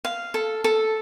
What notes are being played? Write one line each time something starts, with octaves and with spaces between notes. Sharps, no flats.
F5
A4
A4